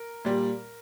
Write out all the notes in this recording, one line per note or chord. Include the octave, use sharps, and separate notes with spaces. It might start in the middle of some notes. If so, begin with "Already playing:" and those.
Already playing: A#4
A#2 G3